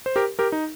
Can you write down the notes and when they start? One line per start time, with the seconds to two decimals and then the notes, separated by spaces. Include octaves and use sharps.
0.06 C5
0.16 G4 A#4
0.39 G4 A#4
0.52 D#4